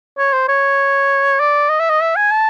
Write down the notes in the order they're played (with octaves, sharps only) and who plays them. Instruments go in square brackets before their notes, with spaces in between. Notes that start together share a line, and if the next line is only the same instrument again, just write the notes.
[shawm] C#5
C5
C#5
D5
D#5
E5
D#5
E5
G#5
A5